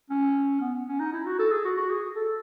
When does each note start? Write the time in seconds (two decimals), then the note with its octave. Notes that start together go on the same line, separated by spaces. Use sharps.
0.10 C#4
0.61 B3
0.88 C#4
1.00 D#4
1.13 E4
1.26 F#4
1.39 A4
1.51 G#4
1.64 F#4
1.77 F#4
1.90 G#4
2.15 A4